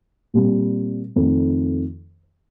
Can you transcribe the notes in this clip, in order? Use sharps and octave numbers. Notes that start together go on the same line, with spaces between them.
A#2 G3 C4
F2 D#3 A3 D#4